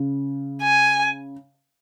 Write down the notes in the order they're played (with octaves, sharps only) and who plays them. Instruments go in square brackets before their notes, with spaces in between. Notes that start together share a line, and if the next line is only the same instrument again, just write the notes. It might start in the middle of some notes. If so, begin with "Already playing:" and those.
Already playing: [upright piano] C#3
[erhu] G#5